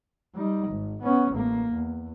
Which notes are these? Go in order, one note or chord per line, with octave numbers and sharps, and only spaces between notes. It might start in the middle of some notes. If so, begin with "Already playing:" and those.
G3 D#4
G#1
B3 C#4
A1 A#3
E2